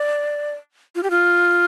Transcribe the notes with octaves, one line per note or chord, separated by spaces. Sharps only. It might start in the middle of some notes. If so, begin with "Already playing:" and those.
Already playing: D5
F4
G4
F4